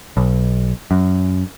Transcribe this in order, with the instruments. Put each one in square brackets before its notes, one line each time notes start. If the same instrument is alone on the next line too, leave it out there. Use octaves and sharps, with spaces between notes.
[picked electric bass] B1
F#2